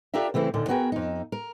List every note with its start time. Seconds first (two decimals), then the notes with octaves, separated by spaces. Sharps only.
0.14 D4 F4 G4 A4 A#4 E5
0.34 C#3 E3 A3 C4 E4
0.54 D#2 A#2 D3
0.68 B3 F#4 G#4 A#4 G5
0.92 F2 D#4
1.32 A#4